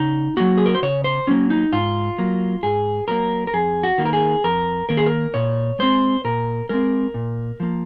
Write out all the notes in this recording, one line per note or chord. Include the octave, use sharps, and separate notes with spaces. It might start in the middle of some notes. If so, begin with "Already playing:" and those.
Already playing: C#3 D#4
F#3 A#3 F#4
G#4
A#4
C5
C#3 C#5
C5
F#3 A#3 C#4
D#4
G#2 F4
F#3 A#3
G#2 G#4
F#3 A#3 A#4
A#4
F2 G#4
F#4
D#3 A#3
A#4
G#4
F2 A#4
D#3 A#3 A#4
G#4
A#4
A#2 C#5
G#3 C4 C5
A#2 A#4
G#3 C4 A#4
A#2
F3 A#3